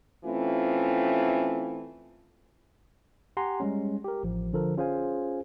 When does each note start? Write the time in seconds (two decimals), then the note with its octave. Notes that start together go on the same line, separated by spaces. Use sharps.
0.24 E3 A3 C4 C#4 F4
3.37 G4 F#5 G#5 A#5 C6
3.60 G3 G#3 C#4
4.04 G4 A#4
4.23 A1 F3
4.53 D3 F3 A4 A#4
4.77 C#4 F4 G#4 C5 F5 G#5